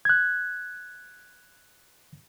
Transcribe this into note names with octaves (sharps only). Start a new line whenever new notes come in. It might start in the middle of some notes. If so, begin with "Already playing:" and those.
F#6 G#6